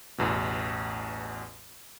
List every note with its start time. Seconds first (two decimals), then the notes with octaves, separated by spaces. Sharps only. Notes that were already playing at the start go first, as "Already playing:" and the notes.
0.18 A1 E2 B2